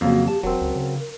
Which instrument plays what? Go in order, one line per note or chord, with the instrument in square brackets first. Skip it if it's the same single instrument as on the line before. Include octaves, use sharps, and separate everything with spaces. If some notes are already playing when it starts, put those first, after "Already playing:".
[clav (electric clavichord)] F2 C#3 [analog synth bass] F#3 [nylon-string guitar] A#3 [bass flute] F#4
[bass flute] G4 [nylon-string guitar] A5
[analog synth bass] E1 [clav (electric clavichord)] F#3 C4 [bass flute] A#4
[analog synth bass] C#2
C#3
[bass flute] A#4